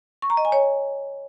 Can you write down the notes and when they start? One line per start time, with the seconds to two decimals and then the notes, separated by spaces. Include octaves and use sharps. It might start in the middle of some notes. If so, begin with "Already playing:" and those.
0.22 C#6
0.30 A#5
0.37 D#5
0.45 G#5
0.52 C#5